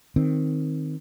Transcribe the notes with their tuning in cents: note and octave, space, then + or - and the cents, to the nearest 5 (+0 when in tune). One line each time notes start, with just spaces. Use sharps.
D#3 +0 C4 +0